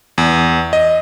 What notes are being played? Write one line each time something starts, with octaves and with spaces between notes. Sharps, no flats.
E2
D#5